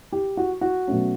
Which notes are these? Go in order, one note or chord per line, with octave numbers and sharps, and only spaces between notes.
G4
F#4
F#4
B2 F#3 A3 C#4